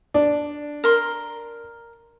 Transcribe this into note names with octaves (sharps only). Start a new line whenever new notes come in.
D4
A#4 C6